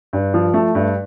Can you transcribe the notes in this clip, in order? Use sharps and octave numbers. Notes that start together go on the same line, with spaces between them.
G2
F3
A3
G2